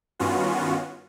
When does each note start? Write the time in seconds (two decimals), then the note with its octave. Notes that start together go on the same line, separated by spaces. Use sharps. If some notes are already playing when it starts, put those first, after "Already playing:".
0.19 G2 D#3 B3 C#4 F4 F#4